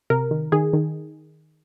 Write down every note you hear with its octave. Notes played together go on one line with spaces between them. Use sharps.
C3 A#4
D#3
D#3 G#4
D#3